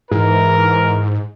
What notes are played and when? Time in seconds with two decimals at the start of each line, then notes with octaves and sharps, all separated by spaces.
0.11 G#2 E3 E4 A#4